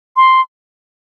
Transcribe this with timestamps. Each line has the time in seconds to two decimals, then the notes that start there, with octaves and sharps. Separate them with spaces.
0.17 C6